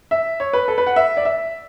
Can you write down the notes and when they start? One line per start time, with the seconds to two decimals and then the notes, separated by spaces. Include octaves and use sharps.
0.11 E5
0.40 C#5
0.53 B4
0.68 A4
0.78 B4
0.87 F#5
0.96 E5
1.17 D5
1.25 E5